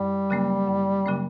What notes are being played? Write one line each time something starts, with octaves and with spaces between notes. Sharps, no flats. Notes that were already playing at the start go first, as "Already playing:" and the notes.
Already playing: F#2 G3
C#3 F#3 A#3 C#4
F#2
C#3 F#3 A#3 C#4